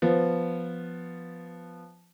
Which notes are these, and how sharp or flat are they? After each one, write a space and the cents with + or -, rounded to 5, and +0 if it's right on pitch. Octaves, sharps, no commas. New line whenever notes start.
F3 +0 B3 +0